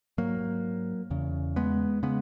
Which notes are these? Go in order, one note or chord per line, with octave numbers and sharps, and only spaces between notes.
G#2 F#3 A#3
E2 C#3
G#3 B3
C#3 G#3 B3